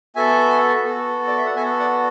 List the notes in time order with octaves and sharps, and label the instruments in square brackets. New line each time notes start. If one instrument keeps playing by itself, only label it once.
[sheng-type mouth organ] B3 F#4 A4 E5 G#5
B3 F#4 A4
D5
E5
F#5
B3 F#4 A4 E5 G#5
D5 F#5